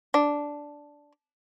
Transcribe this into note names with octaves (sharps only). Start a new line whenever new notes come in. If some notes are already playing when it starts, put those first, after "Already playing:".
D4